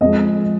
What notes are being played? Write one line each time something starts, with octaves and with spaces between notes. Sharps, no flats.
F2 F3 G#3 D#5